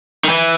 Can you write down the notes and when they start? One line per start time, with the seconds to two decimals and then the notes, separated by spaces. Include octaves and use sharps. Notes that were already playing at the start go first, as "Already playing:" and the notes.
0.24 D#3
0.29 E3